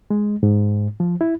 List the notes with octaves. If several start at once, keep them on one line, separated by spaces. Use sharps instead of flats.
G#3
G#2
F3
E4